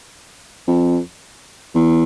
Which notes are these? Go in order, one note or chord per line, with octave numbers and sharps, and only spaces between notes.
F2
E2